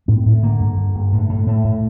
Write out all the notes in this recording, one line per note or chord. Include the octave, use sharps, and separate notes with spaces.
A2 C4
A2
D3 A#3
G2
D3
G2
A2
A2
A2 A3
A2